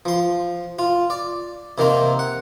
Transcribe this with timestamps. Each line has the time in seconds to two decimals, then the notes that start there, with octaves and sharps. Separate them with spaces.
0.05 F3 C6
0.79 F4
1.10 D5
1.78 C3 D#3 A#3 C4
2.19 F#5